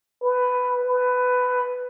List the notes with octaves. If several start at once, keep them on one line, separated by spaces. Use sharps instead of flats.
B4
B4